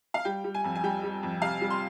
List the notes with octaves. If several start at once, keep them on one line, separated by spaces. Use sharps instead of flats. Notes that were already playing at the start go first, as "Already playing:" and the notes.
F5
G3 G5
G3
G#5
F2
G#5
G3 G5
G3
F2
C3 F5
G3
C6